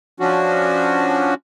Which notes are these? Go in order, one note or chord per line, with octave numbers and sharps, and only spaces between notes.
F3 C#4 D4 F#4